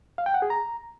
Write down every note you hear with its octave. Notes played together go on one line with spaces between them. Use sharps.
F5
G5
F#5
G#4
A#5